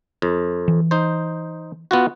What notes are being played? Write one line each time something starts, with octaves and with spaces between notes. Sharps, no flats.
F2
E3
D#4 C5
B3 F4 F#4